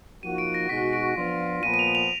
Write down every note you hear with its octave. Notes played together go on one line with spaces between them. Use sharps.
F3 A#3 D#4 F#4 D#7
D7
A#6
B2 G#3 D#4 F#4 B6
D7
F3 B3 D4 F4
A#2 F3 B3 D#7
D#7
F7
F7